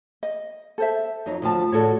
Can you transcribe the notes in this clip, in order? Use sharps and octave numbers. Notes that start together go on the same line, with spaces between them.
D#5
A4 C5 E5
F2 F#3 D#4
D2 F3 A5
A2 F#4 A4 C#5 D5